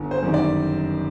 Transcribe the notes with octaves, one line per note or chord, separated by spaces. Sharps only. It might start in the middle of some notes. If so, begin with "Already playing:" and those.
Already playing: G1
C5
F#2 D#3 G3
D5